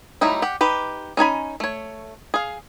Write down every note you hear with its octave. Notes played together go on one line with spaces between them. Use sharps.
F#3 G3 A3 D#4 E4
G4 F#5
D#4 G4 B4
C#4 D#4 G#5 B5
A3 C#5
G#4 F5